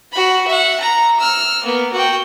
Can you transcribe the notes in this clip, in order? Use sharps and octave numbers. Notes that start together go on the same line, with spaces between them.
F#4 B5
E5 F#5
A#5
E6 F6
A#3 B3
F#4 G5